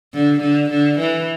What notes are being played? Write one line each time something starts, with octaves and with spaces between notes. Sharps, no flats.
D3
D3
D3
E3